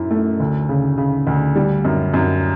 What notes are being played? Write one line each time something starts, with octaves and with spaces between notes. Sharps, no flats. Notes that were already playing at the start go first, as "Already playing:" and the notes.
Already playing: F#2 E4
A3
D2
C#3
C#3
D2
G3
F#2
F#2